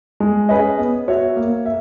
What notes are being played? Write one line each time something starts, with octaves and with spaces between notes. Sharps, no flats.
G#3
C#4 G#4 B4 D#5
B3
F#4 C#5 E5
A#3
E5